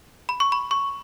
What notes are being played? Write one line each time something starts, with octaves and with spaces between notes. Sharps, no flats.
B5
C#6
B5
C#6